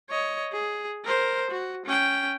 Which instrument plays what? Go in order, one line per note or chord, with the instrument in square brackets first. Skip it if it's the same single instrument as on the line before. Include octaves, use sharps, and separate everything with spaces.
[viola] C#5 D#5
G#4
A#4 C5
F#4
C#4 G5